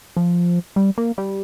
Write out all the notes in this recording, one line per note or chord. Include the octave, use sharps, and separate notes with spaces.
F3
G3
A#3
G3